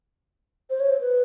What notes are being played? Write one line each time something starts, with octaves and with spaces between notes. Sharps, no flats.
C5
C#5
C5
B4